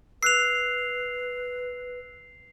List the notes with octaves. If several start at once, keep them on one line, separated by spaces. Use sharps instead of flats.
B4 E6 F#6 C7 F7